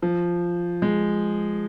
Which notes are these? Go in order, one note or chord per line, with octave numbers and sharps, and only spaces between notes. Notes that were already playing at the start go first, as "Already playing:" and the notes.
F3
G#3